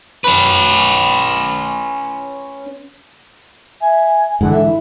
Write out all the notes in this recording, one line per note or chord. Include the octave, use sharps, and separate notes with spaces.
C#4 B4
E5 G#5
G#2 D3 E3 A4 F#5
E5
E4